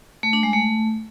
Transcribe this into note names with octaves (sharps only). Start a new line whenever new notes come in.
A3
D4
G#3
A3